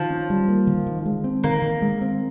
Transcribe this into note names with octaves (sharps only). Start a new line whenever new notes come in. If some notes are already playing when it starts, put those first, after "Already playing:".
Already playing: D#3 F3
C#4
G3
A#3
D#3
D#3
G#3
C4
D#3 A#3
D#3
G#3
C4